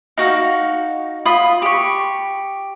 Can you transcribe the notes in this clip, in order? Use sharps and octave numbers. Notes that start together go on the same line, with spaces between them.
D#4 F#4 F5
F4 B5 D#6
G4 C#6